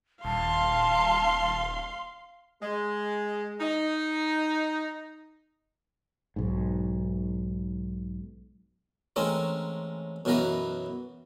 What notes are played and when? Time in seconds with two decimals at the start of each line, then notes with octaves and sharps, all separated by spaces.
0.24 D#1 F5 A5 C6
2.62 G#3
3.61 D#4
6.36 B1 G#2
9.16 A1 G#3 C4 C#4 A#4
10.25 F#2 B2 E3 A#4 B4 A#5